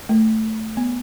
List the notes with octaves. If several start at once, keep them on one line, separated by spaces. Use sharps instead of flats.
A3
B3